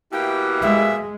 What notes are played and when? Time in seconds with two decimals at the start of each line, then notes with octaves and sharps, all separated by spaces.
0.13 B2 E3 A#3 E4 G4 G5
0.62 G#3 E5